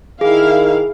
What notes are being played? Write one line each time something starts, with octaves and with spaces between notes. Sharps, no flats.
D#3 E4 G#4 F5